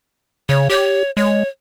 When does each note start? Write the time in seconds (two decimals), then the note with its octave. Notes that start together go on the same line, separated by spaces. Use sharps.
0.49 C#3 C#5
0.70 G4 C#5
1.17 G#3 C#5